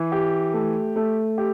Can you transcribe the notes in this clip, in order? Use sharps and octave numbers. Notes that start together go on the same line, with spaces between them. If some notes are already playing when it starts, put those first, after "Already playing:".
Already playing: E3
G4
A3
A3
G4